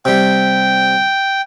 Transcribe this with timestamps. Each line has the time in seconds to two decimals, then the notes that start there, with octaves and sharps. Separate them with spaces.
0.05 C3 G3 G5